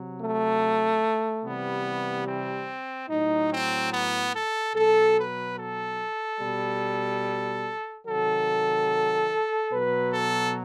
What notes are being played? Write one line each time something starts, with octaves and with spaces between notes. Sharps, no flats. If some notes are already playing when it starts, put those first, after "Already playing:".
Already playing: C3 F#3
A3
C3 E3 G3 B3
C4
A2 F#3 D#4
C4
B3
A4
B2 F#3 A4
B4
A4
B2 G3
C3 D#3 F#3 A4
B2 F#3 B4
A4